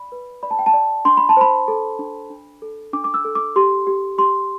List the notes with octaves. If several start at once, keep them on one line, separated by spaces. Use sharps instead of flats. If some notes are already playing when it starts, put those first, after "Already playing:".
Already playing: D5 B5
B4
D5 B5
A5
G5
A5
D5
D4 C6
B5
A5
C5 B5
A4
D4
D4
A4
D4 D6
D6
E6
A4
D6
G4 C6
G4
G4 C6